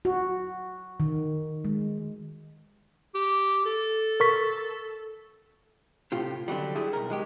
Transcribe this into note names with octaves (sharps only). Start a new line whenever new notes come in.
F#4
D#3
G#3
G4
A4
A#4 C#6 B6
A2 C3 F4 G4
D3 D#3 F#3 G3
F#3 G3 E4 G#4
B1 A#4
D#3 G#3 G4